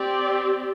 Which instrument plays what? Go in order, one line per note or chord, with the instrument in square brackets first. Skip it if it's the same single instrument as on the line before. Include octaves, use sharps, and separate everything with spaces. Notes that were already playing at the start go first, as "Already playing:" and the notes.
Already playing: [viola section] C4 G4 D5